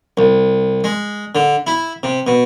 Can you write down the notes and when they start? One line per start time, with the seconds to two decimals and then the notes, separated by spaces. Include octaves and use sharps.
0.17 C2
0.84 G#3
1.35 D3
1.67 E4
2.03 C3
2.27 B2